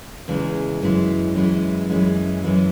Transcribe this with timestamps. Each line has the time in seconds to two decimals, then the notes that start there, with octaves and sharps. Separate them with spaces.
0.28 E2 C#3 E3 G#3
0.82 F#2 E3 G#3 E4
1.35 F#2 E3 G#3 E4
1.89 F#2 E3 G#3 E4
2.44 F#2 E3 G#3 E4